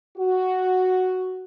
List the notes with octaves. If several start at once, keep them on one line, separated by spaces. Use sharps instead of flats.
F#4